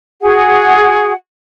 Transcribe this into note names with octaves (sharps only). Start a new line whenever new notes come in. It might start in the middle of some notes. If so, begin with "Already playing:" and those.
F#4 G#4 F#5